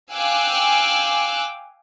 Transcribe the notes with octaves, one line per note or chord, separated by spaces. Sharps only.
F5 G5 G#5 D6 E6 F#6